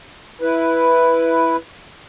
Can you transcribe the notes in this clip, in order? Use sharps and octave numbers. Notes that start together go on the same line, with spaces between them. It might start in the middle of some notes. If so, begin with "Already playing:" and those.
E4 B4